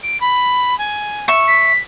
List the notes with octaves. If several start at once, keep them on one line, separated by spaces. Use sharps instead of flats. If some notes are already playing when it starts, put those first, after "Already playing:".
D7
B5
G#5
E5 C#6
B6